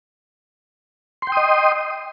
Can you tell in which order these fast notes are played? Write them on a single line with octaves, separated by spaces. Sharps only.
C6 G5 D#6 D#5